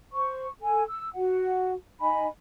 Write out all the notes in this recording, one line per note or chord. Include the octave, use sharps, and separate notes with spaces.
C5 C#6
A4 G#5
E6
F#4 F#5
D#4 D#5 G#5 B5